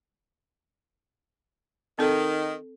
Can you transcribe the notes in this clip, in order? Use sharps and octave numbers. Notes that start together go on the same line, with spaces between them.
D#3 C4 A4